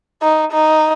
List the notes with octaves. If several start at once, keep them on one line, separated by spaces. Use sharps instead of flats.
D#4
D#4